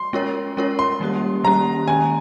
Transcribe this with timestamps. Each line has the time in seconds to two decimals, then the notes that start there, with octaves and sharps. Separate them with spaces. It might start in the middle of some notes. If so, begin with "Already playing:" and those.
Already playing: C6
0.13 G#3 C#4 F4 A#4 C#5
0.57 G#3 C#4 F4 A#4 C#5
0.79 C6
1.00 D#3 G3 A#3 C#4 G4
1.44 D#3 G3 A#3 C#4 G4 A#5
1.88 D#3 G#3 C#4 G#5